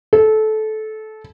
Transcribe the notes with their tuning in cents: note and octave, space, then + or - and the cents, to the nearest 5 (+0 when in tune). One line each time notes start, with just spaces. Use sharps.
A4 -20